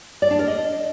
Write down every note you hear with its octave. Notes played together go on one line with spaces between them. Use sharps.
D5
D4
A#4
D#5